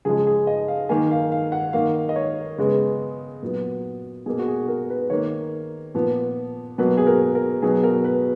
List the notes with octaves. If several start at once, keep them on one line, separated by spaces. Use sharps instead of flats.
C#3 F3 G#3 G#4
G#4
D#5
F5
D#3 A#3 G#5
F5
F5
F#5
D#3 A#3 F5
D#5
C#5
C#3 G#3 B3
A#2 F#3 B3
B2 A#3 G#4
F#4
G#4
A#4
B4
D#3 A#3 C#5
A#2 F3 B3
B2 F#3 A#3 B4
G#4
A#4
A#4
B2 F#3 B3 G#4
A#4
B4